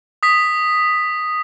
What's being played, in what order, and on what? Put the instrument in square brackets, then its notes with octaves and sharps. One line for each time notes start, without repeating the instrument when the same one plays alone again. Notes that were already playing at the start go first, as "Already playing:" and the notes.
[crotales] D#6 B6